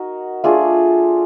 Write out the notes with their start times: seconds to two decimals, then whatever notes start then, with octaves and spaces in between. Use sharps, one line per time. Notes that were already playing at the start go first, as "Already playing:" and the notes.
Already playing: D#4 F#4 A#4
0.44 A3 D4 F4 G#4